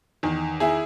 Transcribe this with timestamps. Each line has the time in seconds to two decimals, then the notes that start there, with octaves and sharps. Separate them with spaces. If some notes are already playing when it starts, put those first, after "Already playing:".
0.23 E2 D#3
0.60 E4 G#4